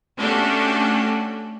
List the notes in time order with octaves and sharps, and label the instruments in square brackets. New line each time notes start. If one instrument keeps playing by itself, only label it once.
[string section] A3 C#4 D4 F#4 G4 A4